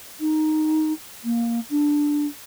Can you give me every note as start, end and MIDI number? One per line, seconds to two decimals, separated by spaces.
0.20 0.92 63
1.24 1.60 58
1.70 2.26 62